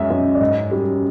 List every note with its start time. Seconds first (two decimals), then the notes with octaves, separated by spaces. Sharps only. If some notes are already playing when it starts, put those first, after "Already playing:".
Already playing: F#2 G#3 D#5 E5
0.10 F#2
0.35 D5
0.41 G#2 D#5
0.71 G3